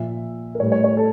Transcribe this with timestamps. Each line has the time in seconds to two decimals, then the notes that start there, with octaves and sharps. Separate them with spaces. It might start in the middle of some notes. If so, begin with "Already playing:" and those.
Already playing: A#2 F3 E5
0.55 A#4
0.59 A2 G3 C#5
0.72 C#5
0.84 C#5
0.97 A4